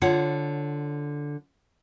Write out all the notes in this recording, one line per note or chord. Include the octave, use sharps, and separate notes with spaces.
D3 F4 C#5 F#5